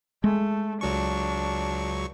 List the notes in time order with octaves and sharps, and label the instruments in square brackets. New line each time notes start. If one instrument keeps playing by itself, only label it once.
[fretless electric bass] G#3 [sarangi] A3
[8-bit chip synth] C#2 F#3 C#6 [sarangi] D4